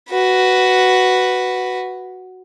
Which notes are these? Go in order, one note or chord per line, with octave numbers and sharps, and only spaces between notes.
F#4 B4